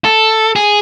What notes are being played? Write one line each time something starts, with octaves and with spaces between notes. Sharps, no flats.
A4
G#4